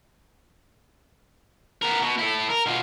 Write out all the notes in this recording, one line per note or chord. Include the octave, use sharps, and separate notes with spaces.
B3 A#4
B2
E4 A4
A#4
B2 F4